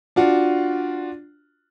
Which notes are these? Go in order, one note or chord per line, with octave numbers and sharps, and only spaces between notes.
D4 F4 F#4